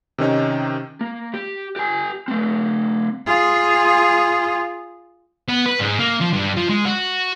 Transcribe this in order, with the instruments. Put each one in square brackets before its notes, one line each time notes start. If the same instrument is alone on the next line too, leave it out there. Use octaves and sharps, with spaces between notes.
[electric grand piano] C3 D#3 C#4 D#4
[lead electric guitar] A#3
G4
G4 G#5
A3 C4
[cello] F4 G#4
[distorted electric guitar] B3
B4
G#2
A#3
F3
G2
F3
G#3
F#4